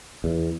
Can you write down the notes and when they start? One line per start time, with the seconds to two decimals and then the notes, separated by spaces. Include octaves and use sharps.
0.24 E2